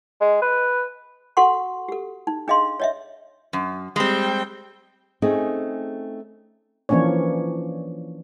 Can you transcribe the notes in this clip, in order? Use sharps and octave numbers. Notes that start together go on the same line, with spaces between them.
G#3
B4
F#4 A4 F#5 C6 C#6
G4 A4
D#4
D4 G#4 D#5 F5 C6
C#5 D#5 E5
F#2
G3 G#3 C4 G5
A3 C4 C#4 D#4 G#4
E3 F3 A#3 C#4 D4 C#5